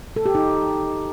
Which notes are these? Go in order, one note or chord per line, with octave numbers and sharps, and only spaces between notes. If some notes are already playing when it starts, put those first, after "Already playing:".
A4
G4
D#4